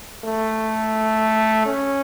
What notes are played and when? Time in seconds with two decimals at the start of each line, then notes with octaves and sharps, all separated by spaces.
0.25 A3
1.66 C#4